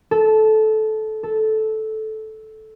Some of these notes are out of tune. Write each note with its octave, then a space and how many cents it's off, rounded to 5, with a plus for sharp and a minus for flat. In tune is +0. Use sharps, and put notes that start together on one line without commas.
A4 -15
A4 -10